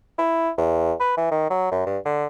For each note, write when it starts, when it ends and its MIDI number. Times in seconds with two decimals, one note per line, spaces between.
0.18 0.50 64
0.58 0.93 40
1.00 1.14 71
1.17 1.28 52
1.31 1.50 51
1.50 1.70 54
1.71 1.85 42
1.86 1.98 43
2.05 2.26 50